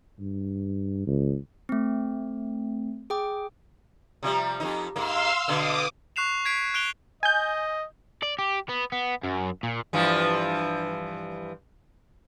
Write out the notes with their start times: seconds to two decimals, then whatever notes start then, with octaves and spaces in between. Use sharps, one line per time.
0.19 G2
1.07 C#2
1.69 A3 C4
3.10 G#4 G5 D6
4.23 C3 F3 G3
4.60 F2 D#4
4.96 G#2 A#3 F5 C6 E6
5.48 B2 D3 B3 D6 D#6
6.16 C#6 F#6 C7 E7 F7
6.45 G#6 B6 C7 D7
6.74 F#6 D7 F7 G7
7.23 D#5 G#5 G6
8.22 D5
8.39 G4
8.69 B3
8.92 B3
9.23 F#2
9.63 A#2
9.93 G2 E3 F3